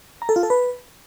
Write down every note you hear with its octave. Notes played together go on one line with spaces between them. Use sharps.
A#5
A4
F4
A4
B4